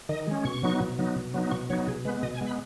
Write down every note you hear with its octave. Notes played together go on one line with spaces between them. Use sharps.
D#3 D#5
G#3 C#4
B2 C#6
F#3 B3 D#4
B2
F#3 B3 D#4
B2
F#3 B3 D#4
B2 C#6
F#3 B3 D#4 C#5
B2 G#4
G#3 B3 B4
B2 D#5
G#5
G#3 B3
B5